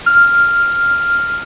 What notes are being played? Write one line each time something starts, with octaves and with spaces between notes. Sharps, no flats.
F6